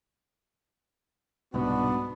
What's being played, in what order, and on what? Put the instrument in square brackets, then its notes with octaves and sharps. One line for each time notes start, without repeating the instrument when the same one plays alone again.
[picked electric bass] C2 G#2 B2 [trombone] B3 [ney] D4 [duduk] F#4